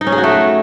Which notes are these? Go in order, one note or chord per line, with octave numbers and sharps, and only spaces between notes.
D#4
C#4
G#4
F#4
A3